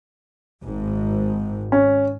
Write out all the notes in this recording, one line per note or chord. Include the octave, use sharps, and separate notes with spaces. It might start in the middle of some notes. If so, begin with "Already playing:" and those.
G#1 G#2
C#4